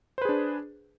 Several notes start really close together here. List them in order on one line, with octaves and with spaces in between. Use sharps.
C5 B4 G#4 D4